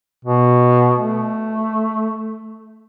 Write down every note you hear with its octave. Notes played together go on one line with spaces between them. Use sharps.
B2
A3